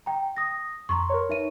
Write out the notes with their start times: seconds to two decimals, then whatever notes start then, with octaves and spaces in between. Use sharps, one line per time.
0.06 G5 A#5
0.37 D#6 A#6
0.89 F2 A#5 C6 C#6
1.10 A#4 B4 C#5
1.29 D#4 E5 D#7